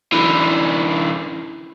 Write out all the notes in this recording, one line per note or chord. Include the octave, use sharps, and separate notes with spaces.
D3 E3